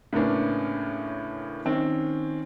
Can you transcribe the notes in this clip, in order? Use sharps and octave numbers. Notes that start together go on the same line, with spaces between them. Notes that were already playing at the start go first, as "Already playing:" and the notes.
A2 C#3 A#3 B3 C#4 D4
D#3 C4 C#4